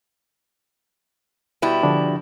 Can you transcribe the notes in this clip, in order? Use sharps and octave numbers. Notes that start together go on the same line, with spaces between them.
B2 G3 E4
D3 F3 D4